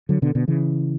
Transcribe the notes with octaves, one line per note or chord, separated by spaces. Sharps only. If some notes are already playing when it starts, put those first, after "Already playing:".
D3 F#3
B2 D3
B2 D3
C#3 E3